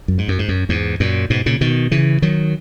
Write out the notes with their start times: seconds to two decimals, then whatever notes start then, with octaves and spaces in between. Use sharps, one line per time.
0.08 F#2
0.18 G#2
0.28 F#2
0.39 G#2
0.48 F#2
0.69 E2 G#2
1.00 F#2 A#2
1.30 G#2 B2
1.46 A#2 C#3
1.61 B2 D#3
1.91 C#3 E3
2.22 D#3 F#3